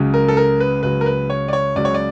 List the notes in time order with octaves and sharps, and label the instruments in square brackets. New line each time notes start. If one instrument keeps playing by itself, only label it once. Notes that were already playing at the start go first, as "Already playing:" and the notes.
Already playing: [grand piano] C#2 C#3 F#3
A#4
A4
A#4
B4
C#2 C#3 F#3 B4
A#4
B4
C#5
D5
C#5
C#2 C#3 F#3 D5
C#5
D5